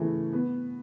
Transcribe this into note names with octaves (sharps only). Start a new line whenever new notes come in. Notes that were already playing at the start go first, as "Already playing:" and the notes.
Already playing: C#3 E3 A3
B3